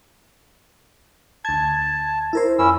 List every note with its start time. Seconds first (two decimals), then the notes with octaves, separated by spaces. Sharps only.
1.45 D2 A5 G#6
2.33 E4 A#4 C5
2.58 F2 C#4 E4 E6